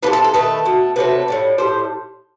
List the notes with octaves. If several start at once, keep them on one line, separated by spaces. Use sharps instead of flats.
C3 E3 A3 B4
A4
A4
D#3 A3 B4
B2 A3
C3 F#3 A3 B4
A2 E3 G3
A2 G3 C5